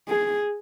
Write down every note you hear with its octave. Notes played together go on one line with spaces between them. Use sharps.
G#4